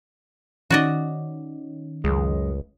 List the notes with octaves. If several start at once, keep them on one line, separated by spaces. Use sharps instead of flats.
D#3 C#4 D#4 F#4 D5 D#5
C#2 F#2 G#3